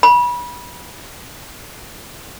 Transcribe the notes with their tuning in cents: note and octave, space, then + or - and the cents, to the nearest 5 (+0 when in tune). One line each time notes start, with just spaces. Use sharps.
B5 -25